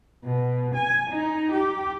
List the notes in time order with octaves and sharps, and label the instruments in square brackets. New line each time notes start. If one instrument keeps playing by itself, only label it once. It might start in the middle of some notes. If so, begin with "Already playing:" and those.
[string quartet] B2
G#5
D#4
G4